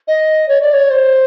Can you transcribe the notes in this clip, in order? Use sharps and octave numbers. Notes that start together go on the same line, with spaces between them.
D#5
C#5
D5
C#5
C5